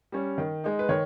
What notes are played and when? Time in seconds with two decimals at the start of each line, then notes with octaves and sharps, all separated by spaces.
0.12 G3 C#4
0.38 D#3
0.64 G#3 D#4
0.79 B4
0.89 D#3 C#5